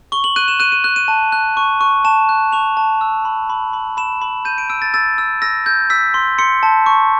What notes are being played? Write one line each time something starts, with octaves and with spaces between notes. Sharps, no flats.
C#6 G7
F#7
F#6 D#7
E7
F#6 D#7
D#7
F#6
D#7
A5
F#6
C#6
C#6
A5 E7
F#6
C#6 F7
A5
E6
B5
B5
B5
B5 E7
B5
G6 D#7
D7
E6 D7
A6
E6 A6
E6
E6 A#6
G6
E6 B6
C6
C6 C#7
A5
C#6